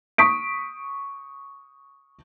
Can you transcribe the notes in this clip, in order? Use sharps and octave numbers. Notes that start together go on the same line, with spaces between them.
C#6 D#6 B6 D7